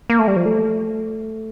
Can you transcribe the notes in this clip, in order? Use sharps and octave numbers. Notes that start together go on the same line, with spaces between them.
A#3
A3
G3
F3
A3